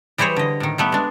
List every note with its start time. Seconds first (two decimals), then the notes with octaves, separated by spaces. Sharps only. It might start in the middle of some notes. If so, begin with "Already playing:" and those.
0.18 E3 G3 G#4 C5 C#5
0.36 D3 D#5
0.60 A2 D#3
0.78 G3 A3 B3
0.92 G#3 D4